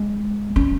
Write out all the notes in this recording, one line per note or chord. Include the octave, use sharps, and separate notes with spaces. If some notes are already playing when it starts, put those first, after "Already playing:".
Already playing: G#3
C#4